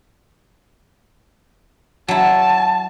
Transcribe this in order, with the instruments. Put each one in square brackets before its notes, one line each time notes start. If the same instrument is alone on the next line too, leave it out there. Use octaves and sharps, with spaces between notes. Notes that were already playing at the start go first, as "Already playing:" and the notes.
[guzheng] F#3 E4 [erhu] A5